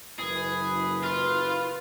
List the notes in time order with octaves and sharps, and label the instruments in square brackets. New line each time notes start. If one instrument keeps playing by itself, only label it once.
[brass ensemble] F#1 E3 B4 [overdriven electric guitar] G#4
[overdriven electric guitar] F4